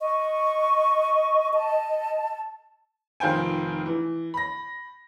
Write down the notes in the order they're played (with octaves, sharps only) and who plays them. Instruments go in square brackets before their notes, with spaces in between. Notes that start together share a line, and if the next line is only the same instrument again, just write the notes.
[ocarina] D#5 [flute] C#6
[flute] A5
[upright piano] F1 D#3 F4 C5 G5 G#5
E3
B5 A#6